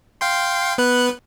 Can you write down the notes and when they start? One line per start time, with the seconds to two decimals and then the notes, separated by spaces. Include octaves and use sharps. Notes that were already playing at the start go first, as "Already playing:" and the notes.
0.21 F5 G5 C6
0.78 B3 B4 F#6